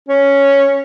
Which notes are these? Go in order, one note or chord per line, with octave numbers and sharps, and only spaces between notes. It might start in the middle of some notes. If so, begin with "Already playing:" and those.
C#4